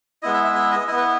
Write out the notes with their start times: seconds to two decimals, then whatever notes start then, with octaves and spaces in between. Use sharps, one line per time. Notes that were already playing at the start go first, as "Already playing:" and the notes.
0.23 G#3 B3 E4 D#5
0.34 E5
0.44 E5
0.55 E5
0.72 D#5
0.88 E4 D#5
0.92 B3 B4